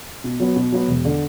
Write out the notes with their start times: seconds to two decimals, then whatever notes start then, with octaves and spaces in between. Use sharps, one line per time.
0.24 B2
0.40 F#3 B3
0.56 B2
0.72 F#3 B3
0.88 E1
1.05 D3